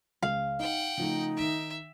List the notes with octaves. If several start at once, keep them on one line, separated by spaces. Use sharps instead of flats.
C#2 G#3 F5
D#4 F#5 G5
C#3 F3 A3 D#4
D#3 E5 D7